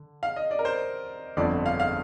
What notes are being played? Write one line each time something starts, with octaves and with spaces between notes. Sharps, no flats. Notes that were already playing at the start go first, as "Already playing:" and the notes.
Already playing: D3
F5
D#5
D5
A#4
C5
G1 F2 D3 D5
F5
F5